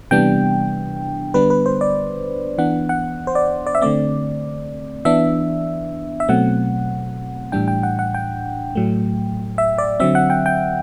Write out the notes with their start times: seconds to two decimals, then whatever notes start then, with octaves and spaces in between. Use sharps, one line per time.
0.11 C3 E3 G3 B3 D4 G5
1.34 D3 G3 B3 D4 B4
1.50 B4
1.66 C5
1.81 D5
2.58 E3 B3 D4 F#5
2.89 F#5
3.27 C5
3.35 D5
3.66 D5
3.75 E5
3.82 D3 A3 C4 D5
5.05 E3 B3 D4 E5
6.20 E5
6.28 B2 F#3 A3 C4 F#5
7.52 A2 E3 G3 D4 G5
7.68 G5
7.83 F#5
7.99 F#5
8.14 G5
8.75 A2 F#3 A3
9.58 E5
9.78 D5
10.00 D3 F#3 C4 E5
10.15 F#5
10.30 G5
10.46 G5